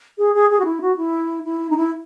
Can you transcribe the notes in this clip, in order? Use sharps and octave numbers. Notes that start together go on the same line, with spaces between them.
G#4
G#4
G#4
F#4
E4
F#4
E4
E4
D#4
E4